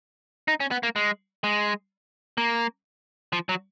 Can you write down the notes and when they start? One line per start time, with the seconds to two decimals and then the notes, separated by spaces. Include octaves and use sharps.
0.48 D#4
0.60 C#4
0.71 B3
0.83 A#3
0.96 G#3
1.44 G#3
2.38 A#3
3.33 F3
3.49 F#3